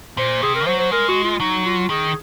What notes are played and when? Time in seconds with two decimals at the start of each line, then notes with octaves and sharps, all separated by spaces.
0.17 A#2 C5
0.42 C3 G#4
0.55 A#4
0.66 F#3 C5
0.79 C5
0.91 G#3 A#4
1.08 F#4
1.24 F4
1.40 F#3 D#4
1.66 F4
1.90 D#3 G#4